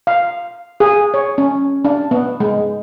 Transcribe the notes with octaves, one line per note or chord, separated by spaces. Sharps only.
F5
G#4
C#5
C#4
D4
B3
G#3